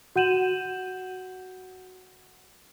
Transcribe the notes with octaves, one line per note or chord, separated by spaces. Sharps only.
F#4 F#5 G6 D#7 E7 F#7